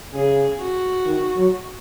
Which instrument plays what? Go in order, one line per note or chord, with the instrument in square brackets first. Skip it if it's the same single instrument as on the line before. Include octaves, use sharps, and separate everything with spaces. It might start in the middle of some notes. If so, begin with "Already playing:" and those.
[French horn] C#3 [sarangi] G#4
[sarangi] F#4
[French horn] D#3
F#3